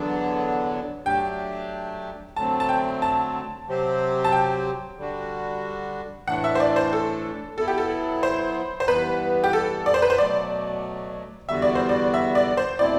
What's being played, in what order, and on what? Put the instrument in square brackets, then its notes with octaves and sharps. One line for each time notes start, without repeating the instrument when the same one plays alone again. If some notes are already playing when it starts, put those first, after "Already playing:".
Already playing: [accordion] E2 D3 F#3 B3 D4
[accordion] F#3 A3 D4 G4 [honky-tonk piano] G5
[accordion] D3 F#3 A3 C4 [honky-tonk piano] A5
[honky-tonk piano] A5
G5
A5
[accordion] C3 F#3 C4 G4 C5
[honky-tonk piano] A5
G5
[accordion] D3 G3 D4 F#4
[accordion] A2 E3 A3 D4 [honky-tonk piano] F#5
[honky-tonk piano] E5
C5
D5
C5
A4
[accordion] F#3 B3 E4 [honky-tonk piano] A4
[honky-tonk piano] G4
A4
C5
C5
[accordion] G2 E3 B3 [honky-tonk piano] B4
[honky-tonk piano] G4
A4
D5
C5
B4
C5
[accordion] B2 F#3 A3 [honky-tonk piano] D5
[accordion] E2 D3 G3 B3 F#4 [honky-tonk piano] E5
[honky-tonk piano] D5
C5
D5
E5
D5
C5
[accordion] B2 A3 C4 E4 [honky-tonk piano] D5